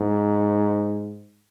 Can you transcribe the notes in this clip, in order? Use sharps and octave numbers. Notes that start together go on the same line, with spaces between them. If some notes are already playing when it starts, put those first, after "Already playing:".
Already playing: G#2